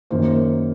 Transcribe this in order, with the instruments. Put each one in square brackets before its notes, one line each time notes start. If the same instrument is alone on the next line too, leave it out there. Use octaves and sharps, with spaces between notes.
[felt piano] F#2 D#3 A#3 C5